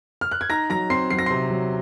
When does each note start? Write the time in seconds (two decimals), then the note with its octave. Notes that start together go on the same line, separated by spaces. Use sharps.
0.21 F6
0.31 F#6
0.41 G#6
0.50 D#4 A#5 A#6
0.70 F#3 A#5 A#6
0.90 C4 C6 C7
1.10 F#3 C7
1.19 A#6
1.26 C3 C6 C7
1.51 F#3